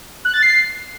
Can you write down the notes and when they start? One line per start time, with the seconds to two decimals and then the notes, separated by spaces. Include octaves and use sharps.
0.25 F#6
0.34 A6
0.43 C7